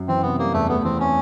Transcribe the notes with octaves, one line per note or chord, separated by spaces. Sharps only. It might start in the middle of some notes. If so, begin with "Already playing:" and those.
Already playing: F#2
E3 C4
C3 B3
G3 A#3
E2 A3
A3 B3
E3 C4
C4 C#4